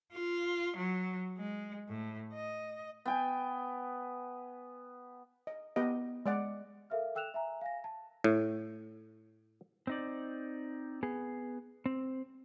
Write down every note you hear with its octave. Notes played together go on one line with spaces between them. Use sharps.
F4
F#3
G#3
A2
D#5
B3 G5 G#5
D#5
B3 G4 D#5
G#3 D5 F#5
A4 A#4 E5 F5 F6
A4 G5 E6 F#6 E7 F7
E5 G#5 A#5
F5 G#5 A#6
A5
A2
C4 D#4 D5
B3 G#4
C4